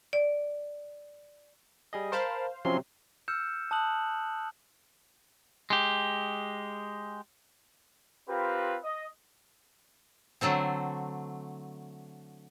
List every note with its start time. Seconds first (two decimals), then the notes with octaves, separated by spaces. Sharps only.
0.13 D5
1.93 G3 G#4 D#5
2.12 A#4 C5 F5 A5 B5
2.65 C3 F3 F#3 C4 C#4 C6
3.28 E6 F6 G6 C#7 E7
3.71 A5 D#6 F#6 F#7
5.70 G#3 G4
8.29 C4 F4 G4 A#4 B4
8.83 D#5
10.41 D3 F#3 A3 C4